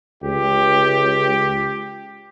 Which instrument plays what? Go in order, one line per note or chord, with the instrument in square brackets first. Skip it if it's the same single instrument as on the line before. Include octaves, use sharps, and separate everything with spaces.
[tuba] C#2 [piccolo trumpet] G4